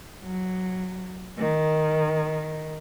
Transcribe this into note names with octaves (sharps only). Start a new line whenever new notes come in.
F#3
D#3